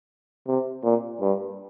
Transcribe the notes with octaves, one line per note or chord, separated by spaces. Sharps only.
C3
A#2
G2